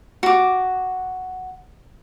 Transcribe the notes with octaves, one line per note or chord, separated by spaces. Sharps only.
F#4 D6